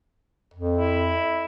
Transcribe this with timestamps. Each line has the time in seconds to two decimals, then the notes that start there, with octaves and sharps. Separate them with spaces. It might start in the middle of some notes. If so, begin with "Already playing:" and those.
0.54 F2
0.77 E4